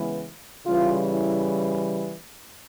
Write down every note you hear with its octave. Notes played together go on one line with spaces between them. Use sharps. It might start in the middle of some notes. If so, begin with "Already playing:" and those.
Already playing: C#3 E3 G#3 B3
C#3 E3 G3 F4
E4